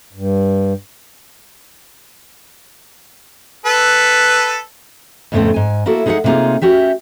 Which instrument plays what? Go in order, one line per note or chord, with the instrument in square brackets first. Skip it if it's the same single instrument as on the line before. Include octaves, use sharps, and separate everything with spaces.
[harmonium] G2
[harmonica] A4 B4
[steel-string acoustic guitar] F2 A2 C#3 A3 B3 C4
G#2 G#5
A#3 E4 F#4 A4
G#3 D#4 G#4 D#5 E5 F#5
C3 G3 A#3 D#4 F4 G#4
C#4 F#4 G4 E5